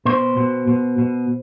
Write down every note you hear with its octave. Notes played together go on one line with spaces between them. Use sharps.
B2 C5
B2
B2
B2